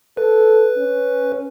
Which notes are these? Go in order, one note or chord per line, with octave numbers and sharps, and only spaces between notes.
A4 B4
C#4